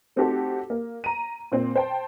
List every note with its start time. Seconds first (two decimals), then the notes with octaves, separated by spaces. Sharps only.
0.16 A3 C4 D#4 F#4 G4 A4
0.70 A#3
1.04 A#5 D#7
1.52 A#2 C4 C5
1.76 C5 G5 A5